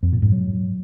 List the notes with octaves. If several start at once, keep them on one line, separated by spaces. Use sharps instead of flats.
F2
A#2
G#2
F#3